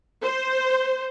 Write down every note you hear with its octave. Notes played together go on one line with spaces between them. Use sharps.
C5